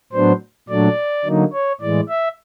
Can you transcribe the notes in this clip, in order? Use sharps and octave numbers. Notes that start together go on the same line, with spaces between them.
A2 F#3 B3 D4 C5
A#2 F#3 A3 D4 D5
D3 F#3 A#3 D#4
C#5
A2 E3 G#3 D5
E5